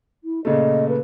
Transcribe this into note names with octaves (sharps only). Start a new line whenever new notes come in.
E4
A#2 C#3 A3 D#5
B4